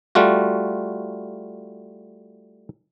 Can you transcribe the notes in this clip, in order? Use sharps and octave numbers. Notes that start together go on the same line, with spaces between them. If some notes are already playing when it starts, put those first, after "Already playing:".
G3 A3 F4 F#4